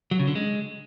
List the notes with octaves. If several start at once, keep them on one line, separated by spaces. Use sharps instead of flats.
F#3
C#3
D3
G#3